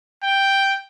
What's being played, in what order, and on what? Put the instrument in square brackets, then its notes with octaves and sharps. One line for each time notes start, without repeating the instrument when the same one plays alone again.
[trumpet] G5